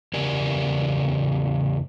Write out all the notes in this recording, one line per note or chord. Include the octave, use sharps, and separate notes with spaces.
E2 C#3 G4 A#4 D5 G#5